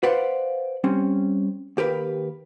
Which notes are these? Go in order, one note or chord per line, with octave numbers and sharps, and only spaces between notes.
B4 C5 D5 F5 F#5
G3 C4 C#4
D#2 G4 A#4 B4